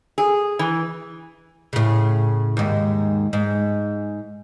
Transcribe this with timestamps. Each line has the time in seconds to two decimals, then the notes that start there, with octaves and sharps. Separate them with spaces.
0.18 G#4
0.59 E3
1.73 A2 C#3
2.57 D#2 G#2
3.33 G#2